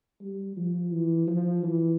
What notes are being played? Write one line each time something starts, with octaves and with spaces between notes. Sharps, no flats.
G3
F3
E3
F3
E3